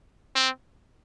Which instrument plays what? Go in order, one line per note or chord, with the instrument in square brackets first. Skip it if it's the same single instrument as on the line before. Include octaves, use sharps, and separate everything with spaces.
[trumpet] C4